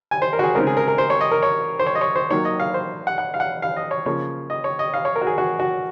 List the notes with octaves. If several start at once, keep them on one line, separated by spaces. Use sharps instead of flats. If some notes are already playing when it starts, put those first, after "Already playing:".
G#5
C5
A#4
F#4
G#4
C#3 G#3 C4 D#4 A#4
G#4
A#4
A#4
C5
C#5
D#5
A#4
C#5
C5
C#5
D#5
C#5
C5
D#3 F#3 A#3 C#5
D#5
F5
C5
F#5
F#5
F5
F#5
F5
D#5
C#5
C#3 F3 A#3 C#5
D#5
C#5
D#5
F5
C#5
A#4
F#4
G#4
F#4
F#4